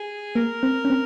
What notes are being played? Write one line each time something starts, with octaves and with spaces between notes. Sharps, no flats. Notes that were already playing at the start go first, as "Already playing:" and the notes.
Already playing: G#4
A#3 A#4
C4
C#4
C4